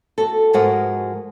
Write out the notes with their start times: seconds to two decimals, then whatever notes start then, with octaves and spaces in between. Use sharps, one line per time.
0.18 F#4 A4
0.53 G#2 F3 G#3 F#4 A#4 F#5